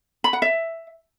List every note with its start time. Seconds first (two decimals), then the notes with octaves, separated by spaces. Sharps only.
0.24 B5
0.33 F#5
0.42 E5